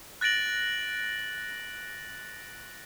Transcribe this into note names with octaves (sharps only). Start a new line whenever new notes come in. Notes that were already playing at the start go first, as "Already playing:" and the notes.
F#6 A6 A#6 D7 F#7